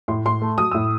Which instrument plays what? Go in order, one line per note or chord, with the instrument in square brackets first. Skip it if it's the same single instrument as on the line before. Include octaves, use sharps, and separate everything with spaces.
[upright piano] A2 C6
A2 C6
A3
F#3 D#6
A2 E6